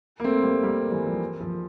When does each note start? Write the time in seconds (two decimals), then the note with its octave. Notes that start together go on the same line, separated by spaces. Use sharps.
0.20 A#3
0.24 A3 C4
0.43 G3 A#3
0.63 G3 A#3
0.91 E3 G3
1.06 F3
1.41 F3